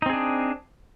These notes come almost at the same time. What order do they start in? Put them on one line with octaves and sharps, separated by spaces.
D#4 C4 G#4 D4